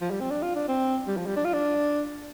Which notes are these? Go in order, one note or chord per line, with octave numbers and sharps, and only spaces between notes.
F3
G3
C4
D4
F4
D4
C4
G3
F3
G3
D4
F4
D4